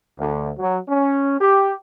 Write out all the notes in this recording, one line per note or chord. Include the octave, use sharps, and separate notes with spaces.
D2
F#3
C#4
G4